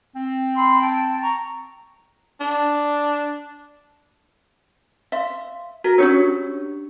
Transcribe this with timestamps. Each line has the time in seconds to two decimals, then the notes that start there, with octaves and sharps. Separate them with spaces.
0.16 C4
0.54 B5 C6 E6
0.80 G5 A5
1.20 A#5 C#6
2.40 D4
5.12 E5 F5 C6
5.84 F#4 A#4
5.98 C#4 D4 G4 C#5 E6